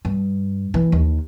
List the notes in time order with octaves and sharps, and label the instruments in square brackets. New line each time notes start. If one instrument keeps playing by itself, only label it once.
[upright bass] G2
E3
D#2